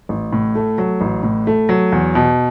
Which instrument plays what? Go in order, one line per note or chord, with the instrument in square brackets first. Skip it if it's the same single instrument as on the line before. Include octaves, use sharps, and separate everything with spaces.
[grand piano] A1
A2
A3
F#3
A1
A2
A3
F#3
E2
B2